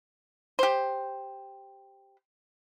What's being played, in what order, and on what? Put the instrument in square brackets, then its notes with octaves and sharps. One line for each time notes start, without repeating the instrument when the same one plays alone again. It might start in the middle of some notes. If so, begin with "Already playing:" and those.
[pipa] G4 C5